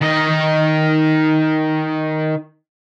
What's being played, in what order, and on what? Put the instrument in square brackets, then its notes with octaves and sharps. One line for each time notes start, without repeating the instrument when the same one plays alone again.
[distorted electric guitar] D#3 D#5